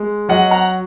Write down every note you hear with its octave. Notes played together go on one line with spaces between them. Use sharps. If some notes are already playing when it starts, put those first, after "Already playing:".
Already playing: G#3
F#3 D#5 F#5
F#5 A#5